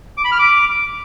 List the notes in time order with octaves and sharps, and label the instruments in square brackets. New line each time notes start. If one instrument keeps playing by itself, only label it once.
[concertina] D6
B5
F6
D6